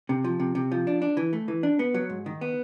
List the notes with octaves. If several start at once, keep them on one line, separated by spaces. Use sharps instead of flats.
C3
F3
C3
C3
F3
D4
D4
E3
A3
E3
D4
B3
F#3
G#2
D#3
B3